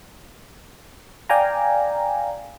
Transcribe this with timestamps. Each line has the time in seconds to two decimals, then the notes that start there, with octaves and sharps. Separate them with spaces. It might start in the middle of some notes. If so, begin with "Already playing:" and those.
1.29 D5 F5 G5 G#5 A#5